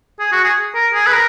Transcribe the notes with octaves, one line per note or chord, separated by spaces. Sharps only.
G#4
F#4
G#4
A#4
G#4
B4
A#4